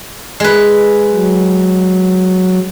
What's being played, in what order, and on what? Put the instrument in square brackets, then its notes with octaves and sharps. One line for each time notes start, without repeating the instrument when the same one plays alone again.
[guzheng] G#3 B4
[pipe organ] F#3